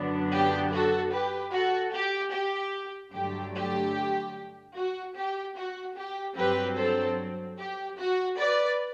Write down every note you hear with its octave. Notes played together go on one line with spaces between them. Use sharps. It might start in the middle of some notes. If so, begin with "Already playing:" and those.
Already playing: F#2 D3 F#3 B3 D4
G4
F#4 A4
G4 B4
F#4 A4
G4
G4
G2 D3 F#3 A3 G4
G4
F#4
G4
F#4
G4
G2 F#3 C4 G4 B4
A4 C5
G4
F#4
B4 D5